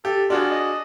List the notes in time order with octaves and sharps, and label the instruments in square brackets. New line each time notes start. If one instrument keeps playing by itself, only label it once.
[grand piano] G4 [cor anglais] A4
[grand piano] D4 F#4 G#4 [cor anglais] F4
[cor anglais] D#5